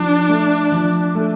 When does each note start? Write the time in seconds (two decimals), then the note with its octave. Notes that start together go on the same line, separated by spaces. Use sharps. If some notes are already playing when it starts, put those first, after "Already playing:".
Already playing: F3 D4
0.29 A3
0.72 F3
1.15 A3